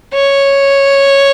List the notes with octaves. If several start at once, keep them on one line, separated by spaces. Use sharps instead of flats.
C#5